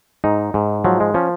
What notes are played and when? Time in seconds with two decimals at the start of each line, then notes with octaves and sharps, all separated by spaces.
0.24 G#2 D#4
0.54 G#2
0.85 F3 F#3
1.00 G#3
1.14 F3 C#4